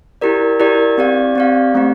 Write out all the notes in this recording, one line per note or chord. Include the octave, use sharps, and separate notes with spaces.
E4 G4 A#4 D5
E4 G4 A#4 D5
C4 G4 D5 F5
C4 G4 D5 F5
A3 C4 G4